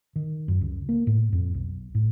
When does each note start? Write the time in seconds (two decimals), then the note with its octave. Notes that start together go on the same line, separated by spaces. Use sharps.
0.16 D#3
0.48 F#2
0.61 C#2
0.89 A#3
1.07 A2
1.33 F2
1.54 B1
1.95 A2